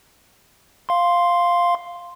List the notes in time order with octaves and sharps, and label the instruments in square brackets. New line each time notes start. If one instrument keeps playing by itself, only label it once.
[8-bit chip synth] F5 C6